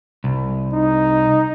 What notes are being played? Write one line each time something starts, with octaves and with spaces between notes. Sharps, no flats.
C2
D#4